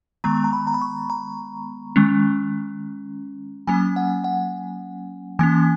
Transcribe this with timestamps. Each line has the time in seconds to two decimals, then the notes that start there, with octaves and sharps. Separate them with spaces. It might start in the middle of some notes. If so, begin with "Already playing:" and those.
0.24 D#3 G#3 B3 A#5
0.44 A#5
0.53 B5
0.67 A#5
0.74 B5
0.82 C#6
1.10 A#5
1.96 D#3 G#3 C#4
3.67 F#3 A#3 C#4 G#5
3.96 F#5
4.24 F#5
5.39 E3 A#3 C#4 G#5